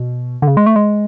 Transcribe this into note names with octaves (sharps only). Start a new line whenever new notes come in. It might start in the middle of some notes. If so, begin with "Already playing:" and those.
Already playing: B2
D3
C#3
G#3
A3
G#3